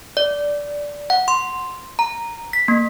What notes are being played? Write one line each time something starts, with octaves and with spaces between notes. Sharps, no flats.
D5
F#5
C6
A#5
B6
A#3